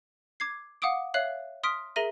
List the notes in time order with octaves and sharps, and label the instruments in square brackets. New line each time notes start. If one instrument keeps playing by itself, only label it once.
[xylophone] D6 G#6 C7
F5 F#5 D6 D#6 D7
C#5 E5 F5 F#6 C7 F#7
C6 D#6 F6 B6 D7
G#4 A#4 E5 A#5 A#6 D#7